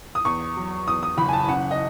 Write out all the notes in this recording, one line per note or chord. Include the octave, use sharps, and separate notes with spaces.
D#6
E2 C#6
F#3
E2 D#6
D#6
F#1 B5
G#5
A5
C#3 F#5
D#5